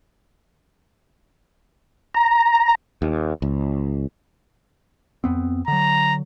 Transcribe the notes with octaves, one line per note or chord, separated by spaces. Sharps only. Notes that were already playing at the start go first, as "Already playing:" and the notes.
A#5
D#2
C#2
F2 B3 C4
D3 F#3 A#5